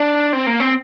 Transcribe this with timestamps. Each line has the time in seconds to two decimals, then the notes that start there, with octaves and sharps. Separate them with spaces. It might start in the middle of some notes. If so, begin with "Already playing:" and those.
Already playing: D4
0.33 C4
0.47 A#3
0.60 C4